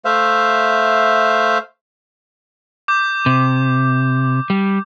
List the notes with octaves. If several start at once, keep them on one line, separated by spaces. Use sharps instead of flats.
A3 C5 E5 F5
D6 G6
C3
G3